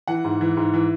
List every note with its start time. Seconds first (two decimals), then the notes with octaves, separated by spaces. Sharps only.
0.07 E3 F#5
0.25 G#2
0.41 E3
0.57 G#2
0.74 E3